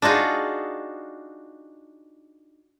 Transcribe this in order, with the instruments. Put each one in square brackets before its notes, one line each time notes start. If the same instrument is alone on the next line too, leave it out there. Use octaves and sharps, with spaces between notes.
[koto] D4 D#4 F4 F#4 G#4